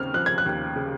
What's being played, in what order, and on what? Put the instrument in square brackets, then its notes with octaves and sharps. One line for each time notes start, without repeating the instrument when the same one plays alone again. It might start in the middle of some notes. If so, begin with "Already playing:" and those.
Already playing: [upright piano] D#2 C#3 C4 [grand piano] F6
[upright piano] F3 [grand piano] F#6
[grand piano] G#6
F#6
[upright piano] D#2
C#3